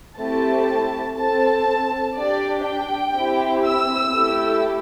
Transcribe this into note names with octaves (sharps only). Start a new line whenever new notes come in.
A3 C4 E4 G4 A5
C4 A4 A5
D4 G4 D5
G5
C4 E4 G4
E6
A3 E4 G4